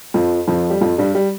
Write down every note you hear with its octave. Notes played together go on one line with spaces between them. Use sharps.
F2 F3
F2 F3
G3
F2 F3
G2 G3
G3